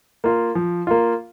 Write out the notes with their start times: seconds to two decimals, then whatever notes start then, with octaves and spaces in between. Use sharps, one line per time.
0.24 A#3 F4
0.55 F3
0.87 A#3 F4